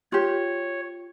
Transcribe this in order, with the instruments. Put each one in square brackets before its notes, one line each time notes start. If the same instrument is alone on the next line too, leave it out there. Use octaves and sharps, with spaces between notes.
[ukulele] F4 G4 [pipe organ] C#5